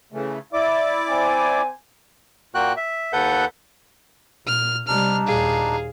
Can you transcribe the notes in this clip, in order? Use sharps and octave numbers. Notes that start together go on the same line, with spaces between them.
C#3 E3 A3
E4 D5 E5 D6
C4 C5 G#5
A#2 A#3 F#4 G5 F#6
E5
D#2 A4 B4 F#5 G6
A#2 F6
C3 G3 D4 D#4 F6
D#2 A#2 G#4 F5